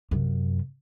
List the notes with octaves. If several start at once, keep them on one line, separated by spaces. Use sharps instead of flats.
F#2 C3